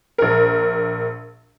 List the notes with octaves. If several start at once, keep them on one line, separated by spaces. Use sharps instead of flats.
A#1 A#4